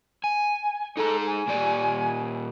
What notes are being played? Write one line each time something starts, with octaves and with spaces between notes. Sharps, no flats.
G#5
D#4 G#4 A4 A#5
G#5
A#2 G4 D5